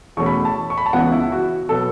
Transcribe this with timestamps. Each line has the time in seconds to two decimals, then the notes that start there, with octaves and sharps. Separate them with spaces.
0.17 E2 B2 A3 C#4 C#6
0.26 B5
0.45 A5
0.70 C#6
0.78 B5
0.86 A5
0.93 C#2 C#3 E3 B3 F#5
1.12 E4
1.32 F#4
1.69 B2 F#3 B3 A4